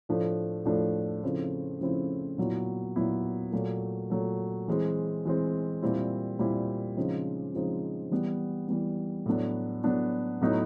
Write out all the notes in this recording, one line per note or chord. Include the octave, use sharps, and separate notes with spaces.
A2 F3 A3 D4
A2 F3 A3 D4
C#3 F3 A3 C4 E4
C#3 F3 A3 C4 E4
A#2 F#3 B3 E4
A#2 F#3 B3 E4
A#2 F#3 A3
A#2 F#3 A3
E3 G#3 C4
E3 G#3 C4
A#2 G3 C4 E4
A#2 G3 C4 E4
C#3 F3 G#3 C4 D#4
C#3 F3 G#3 C4 D#4
E3 G3 B3
E3 G3 B3
A2 F#3 B3 D4 F#4
A2 F#3 B3 D4 F#4
A2 F#3 B3 D#4